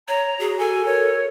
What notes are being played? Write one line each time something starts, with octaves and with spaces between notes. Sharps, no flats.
C#5 A#5
F#4 G#4
A4 G#5
A#4 C#5